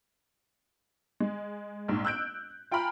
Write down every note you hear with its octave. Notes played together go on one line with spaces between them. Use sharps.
G#3
A#1 G#2
E6 F#6 G6 D7
F4 G5 G#5 A#5 B5 F6